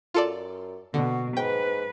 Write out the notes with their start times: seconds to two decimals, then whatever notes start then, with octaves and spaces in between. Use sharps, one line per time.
0.14 F#2 F4 A4 D5
0.94 B2 D3 F#4
1.37 G#2 B4 G5